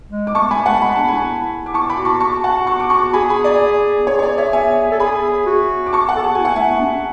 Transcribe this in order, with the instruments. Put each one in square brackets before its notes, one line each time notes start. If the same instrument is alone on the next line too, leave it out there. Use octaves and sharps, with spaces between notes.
[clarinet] G#3
[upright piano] D6
[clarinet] A3 [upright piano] A5 C#6
[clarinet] A3 [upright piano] G#5 B5
[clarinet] G#3 [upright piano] F#5 A5
[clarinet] G#3 [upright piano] B5
[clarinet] D4 [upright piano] A5
[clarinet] E4 [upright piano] G#5 B5
[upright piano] D6
[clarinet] E4 [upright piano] A5 C#6
[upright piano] B5 D6
[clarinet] F#4
[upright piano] A5 C#6
A5 C#6
F#5 A5
C#6
D6
A5 C#6
[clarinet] G#4 [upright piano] G#5 B5
[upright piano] G#5 B5
D5
[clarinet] G#4 [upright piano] C#5
[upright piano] C#5
D5
C#5 E5
E5 G#5
[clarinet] A4
[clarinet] G#4 [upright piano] G#5 B5
[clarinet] F#4
[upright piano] D6
A5 C#6
F#5 A5
[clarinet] A4
[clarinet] G#4 [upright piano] A5
[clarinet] F#4
[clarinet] E4 [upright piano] G#5
[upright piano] F#5
[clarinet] A3 [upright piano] E5 G#5
[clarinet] B3
D4
C#4